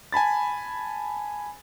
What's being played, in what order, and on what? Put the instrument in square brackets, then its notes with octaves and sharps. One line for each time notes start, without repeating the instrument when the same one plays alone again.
[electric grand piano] G#5 A5 B5 A6